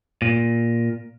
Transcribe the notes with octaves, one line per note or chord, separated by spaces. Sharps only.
A#2